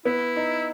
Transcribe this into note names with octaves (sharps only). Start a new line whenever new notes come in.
B3 E4
D#4